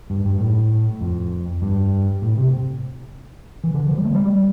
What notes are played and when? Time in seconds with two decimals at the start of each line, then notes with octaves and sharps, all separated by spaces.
0.10 G2
0.25 G2
0.41 A2
1.01 F2
1.62 G2
2.22 A2
2.37 C3
3.64 E3
3.74 D3
3.89 F3
3.98 G3
4.05 A3
4.15 G3
4.25 G3